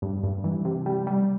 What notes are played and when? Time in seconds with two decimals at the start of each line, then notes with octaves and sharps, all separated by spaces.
0.02 G2
0.23 G2
0.44 E3
0.65 C3
0.86 G3
1.07 G3